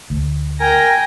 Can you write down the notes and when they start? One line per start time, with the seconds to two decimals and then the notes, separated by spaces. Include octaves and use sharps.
0.10 D2
0.60 A#4 G5 G#5 A#6